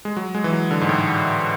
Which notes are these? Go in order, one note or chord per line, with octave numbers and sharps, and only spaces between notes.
G#3
F#3
G#3
E3
F#3
D3
G#2
A2